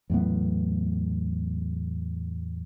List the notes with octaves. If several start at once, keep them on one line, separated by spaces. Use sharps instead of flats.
E2 A2 F#3 B3